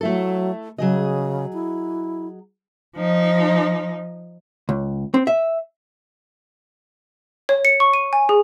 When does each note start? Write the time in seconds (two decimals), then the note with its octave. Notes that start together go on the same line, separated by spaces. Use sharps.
0.01 F#3 A3 E4 A4
0.78 C#3 F#3 G#4 D#5
1.53 E4
2.97 F3 D#4
4.69 C#2
5.14 C4
5.27 E5
7.49 C#5
7.65 C#7
7.80 C#6
7.94 D#7
8.13 G#5
8.29 G#4